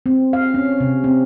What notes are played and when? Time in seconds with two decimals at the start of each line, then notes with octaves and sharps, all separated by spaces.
0.06 C4
0.33 F5
0.54 C#4
0.80 C3
1.04 C4